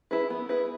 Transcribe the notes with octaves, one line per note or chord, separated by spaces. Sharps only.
E4 G#4 B4
B3
E4 G#4 B4